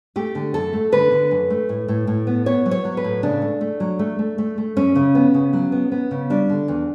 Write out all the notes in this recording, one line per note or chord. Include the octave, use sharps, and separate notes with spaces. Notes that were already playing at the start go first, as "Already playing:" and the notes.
A3 G4
D3
F#2 A4
A3
D3 B4
D3
F#2
A3
A2
A2
A2
B3
B3 C#5
F#3
C#5
F#3
B4
A2
C#3 D4
A3
A3
F#3
A3
A3
A3
A3
F#2 C#4
C#3
B3
C#3
F#3
B3
B3
C#3
G3 D4
D3
E2